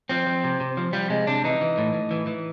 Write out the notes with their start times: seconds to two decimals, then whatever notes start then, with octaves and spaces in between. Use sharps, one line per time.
0.09 F3 C4
0.27 F3
0.44 C3
0.60 C3
0.77 F3
0.93 F3 G3
1.10 C3 G#3
1.27 C3 D4
1.44 E3 D#4
1.61 E3
1.78 A2
1.94 A2
2.11 E3
2.27 E3